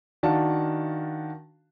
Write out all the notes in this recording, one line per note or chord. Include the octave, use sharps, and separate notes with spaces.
D#3 D4 F#4 F5 A5